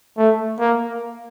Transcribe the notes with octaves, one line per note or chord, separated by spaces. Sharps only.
A3
A#3